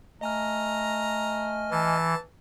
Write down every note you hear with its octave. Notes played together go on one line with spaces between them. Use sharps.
A3 D#5 G#5 A#5 F6
E3 A5